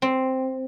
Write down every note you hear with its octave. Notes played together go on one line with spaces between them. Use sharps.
C4